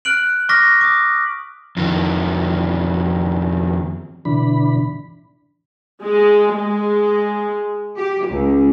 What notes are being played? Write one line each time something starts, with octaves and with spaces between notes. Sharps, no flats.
F6 F#6 D7 F#7
C#6 D6 F6 A#6 B6
D6 D#6
F2 D#3
B2 D3 E3 D4 B5
G#3
G#3
G4
C#2